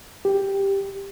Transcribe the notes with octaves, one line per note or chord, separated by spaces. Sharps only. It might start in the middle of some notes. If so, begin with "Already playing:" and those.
G4